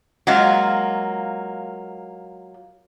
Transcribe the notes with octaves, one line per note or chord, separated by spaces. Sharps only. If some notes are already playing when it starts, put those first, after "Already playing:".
F#3 G#3 A#3 F4